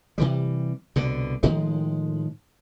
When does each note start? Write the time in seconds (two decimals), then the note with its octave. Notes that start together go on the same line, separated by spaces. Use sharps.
0.18 C3 E3 G3
0.96 C2 B2 D3
1.43 A2 D#3 F3 G#3